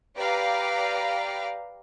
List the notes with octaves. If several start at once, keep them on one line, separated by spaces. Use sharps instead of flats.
G4 B4 D5 F5 A#5